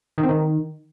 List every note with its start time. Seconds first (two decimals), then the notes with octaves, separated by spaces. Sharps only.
0.18 D#3
0.23 C4
0.29 D#3